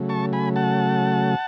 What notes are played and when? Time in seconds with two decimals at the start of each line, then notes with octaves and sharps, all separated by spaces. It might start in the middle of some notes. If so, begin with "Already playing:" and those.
Already playing: C#3 F#3 A3
0.09 A5 C#6
0.33 G#5 B5
0.56 F#5 A5